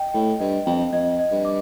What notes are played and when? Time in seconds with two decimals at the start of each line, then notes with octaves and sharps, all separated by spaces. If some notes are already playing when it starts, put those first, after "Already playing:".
Already playing: D#5 G5
0.13 A2 G5
0.40 G2 D#5
0.66 F2 G5
0.92 F2 D#5
1.19 D#5
1.32 G2
1.45 D6